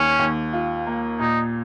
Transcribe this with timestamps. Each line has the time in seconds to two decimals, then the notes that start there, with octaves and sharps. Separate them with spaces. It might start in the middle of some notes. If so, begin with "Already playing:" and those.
Already playing: D#2 C#4
0.19 D#2
0.53 F4
0.86 A#3
1.19 A#2 D#4